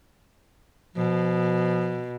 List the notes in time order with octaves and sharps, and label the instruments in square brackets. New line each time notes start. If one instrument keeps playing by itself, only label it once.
[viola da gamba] B2 [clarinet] F3